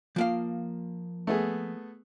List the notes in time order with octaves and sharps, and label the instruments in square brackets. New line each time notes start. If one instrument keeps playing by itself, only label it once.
[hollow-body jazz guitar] F3 A#3 F5
[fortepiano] A3 B3 G#4